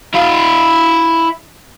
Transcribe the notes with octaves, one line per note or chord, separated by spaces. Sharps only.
E4 F5